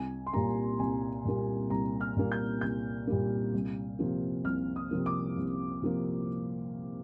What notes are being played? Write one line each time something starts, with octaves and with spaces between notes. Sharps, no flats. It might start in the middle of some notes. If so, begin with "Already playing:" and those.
Already playing: C2 G#5
C6
A#2 G3 A#3 A#5
C2 G#5
A#2 G3 A#3
C2 A#5
F6
A#2 G3 A#3
G6
C2 G6
A#2 G3 A#3
C2
C3 F3 A#3
C2 F6
D#6
C3 F3 A#3
D6
C2
C3 F3 A#3